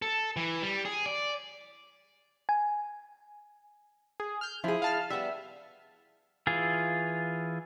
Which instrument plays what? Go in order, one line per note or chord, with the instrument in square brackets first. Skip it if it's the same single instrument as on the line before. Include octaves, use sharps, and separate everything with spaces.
[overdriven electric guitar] A4
E3
G3
G#4
D5
[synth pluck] G#5
[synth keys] G#4
F6 G6
[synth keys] F3 [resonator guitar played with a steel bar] E4 G#4
[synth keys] F5 A5 F6
[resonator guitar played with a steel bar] G3 B3 [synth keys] E5
[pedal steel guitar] E3 F4 G#4